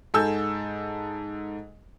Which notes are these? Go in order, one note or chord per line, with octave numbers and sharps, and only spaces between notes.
G#2 A4 G#5 E6 G6